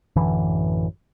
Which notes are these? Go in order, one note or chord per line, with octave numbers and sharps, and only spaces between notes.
A1 F#2 D3 E3